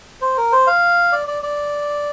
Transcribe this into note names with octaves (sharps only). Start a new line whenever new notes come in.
C5
A#4
C5
F5
D5
D5
D5